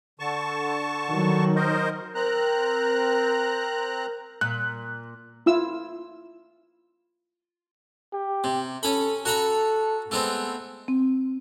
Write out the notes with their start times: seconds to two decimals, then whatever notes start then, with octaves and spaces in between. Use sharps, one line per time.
0.20 D3 A5 C#6
1.08 D#3 F#3
1.56 A#4 C5 D#5
2.15 C4 A#4 A#5 F#6
4.41 A#2 F#6
5.46 E4 F4 E6
8.13 G4
8.44 C3
8.83 C#4 A4 B5
9.25 F#4 A4 A#5 B5
10.11 G#3 A3 B3 C4
10.88 C4